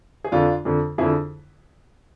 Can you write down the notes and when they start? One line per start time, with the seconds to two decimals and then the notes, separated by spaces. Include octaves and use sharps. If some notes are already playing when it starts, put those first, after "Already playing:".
0.24 G#4
0.32 F2 D3 D4 F4
0.65 F2 D3
0.98 F2 D3 E4 G#4